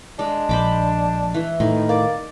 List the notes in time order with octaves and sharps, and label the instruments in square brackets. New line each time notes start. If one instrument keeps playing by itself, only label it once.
[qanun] G#3 [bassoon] D4
[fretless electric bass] A#1 [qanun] C5 B5 D6
[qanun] E3
[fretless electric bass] A2 [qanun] D#3
[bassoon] A#3 [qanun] D5